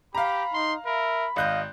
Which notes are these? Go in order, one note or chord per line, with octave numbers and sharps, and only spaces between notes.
G4 F5 A#5 B5
D#4 C6
A#4 E5 B5
G#1 D#5 F5 F#6 G6